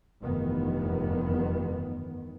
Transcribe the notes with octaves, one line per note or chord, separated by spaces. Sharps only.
F1 E2 G2 D#3 B3